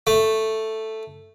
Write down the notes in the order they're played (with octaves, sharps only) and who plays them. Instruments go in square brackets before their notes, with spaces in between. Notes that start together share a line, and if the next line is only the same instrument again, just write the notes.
[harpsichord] A3